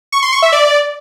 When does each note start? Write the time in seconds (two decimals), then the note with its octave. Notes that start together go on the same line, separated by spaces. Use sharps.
0.12 C#6
0.22 C6
0.32 C#6
0.42 E5
0.52 D5